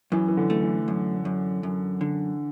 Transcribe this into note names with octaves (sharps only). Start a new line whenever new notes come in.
F#2 E3
E3
D3
A3
E3
F#2
F#2
F#2
D3